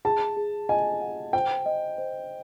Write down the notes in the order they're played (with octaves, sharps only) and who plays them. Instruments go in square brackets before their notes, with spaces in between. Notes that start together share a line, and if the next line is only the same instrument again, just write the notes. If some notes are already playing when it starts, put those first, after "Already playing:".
[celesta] G#4 [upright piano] A5
[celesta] G#4
[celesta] D#5 [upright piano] G#5
[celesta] F#5
[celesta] C5 [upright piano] G5
[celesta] D#5
C5